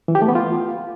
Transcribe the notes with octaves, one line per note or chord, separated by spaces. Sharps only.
E3
G4
A3
B3
F4